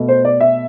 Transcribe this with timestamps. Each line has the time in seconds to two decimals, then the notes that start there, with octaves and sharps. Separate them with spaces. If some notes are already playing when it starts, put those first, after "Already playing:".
Already playing: B2 A3
0.09 C5
0.25 D5
0.40 E5